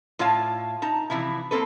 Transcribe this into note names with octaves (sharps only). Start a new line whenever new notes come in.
A2 F4 C#5 F5 A5
D#4 A5 A#5
C3 E3 F3 E4
A#3 C4 A4 B4